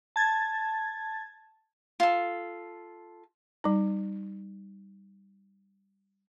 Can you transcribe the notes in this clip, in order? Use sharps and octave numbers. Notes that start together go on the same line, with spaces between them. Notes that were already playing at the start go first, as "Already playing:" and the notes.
A5 G#6 A6
F4 A4
G3 D#4